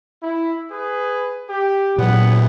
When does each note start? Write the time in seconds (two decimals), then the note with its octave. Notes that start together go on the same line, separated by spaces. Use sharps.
0.22 E4
0.70 G#4 B4
1.49 G4
1.98 A#2 F#3 B3 B4 F#5